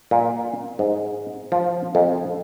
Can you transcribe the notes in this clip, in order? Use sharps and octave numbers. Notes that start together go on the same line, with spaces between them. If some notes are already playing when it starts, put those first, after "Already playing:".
A#2
G#2
F3
F2